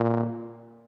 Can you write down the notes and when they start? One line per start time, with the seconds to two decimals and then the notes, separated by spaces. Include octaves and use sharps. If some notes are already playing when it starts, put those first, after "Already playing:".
Already playing: A#2